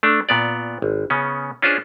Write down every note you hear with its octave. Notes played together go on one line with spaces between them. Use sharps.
A3 D4
A#2 B3 D5
G#1
C#3 B3 C#4
C#4 D4 F4 G#4 C5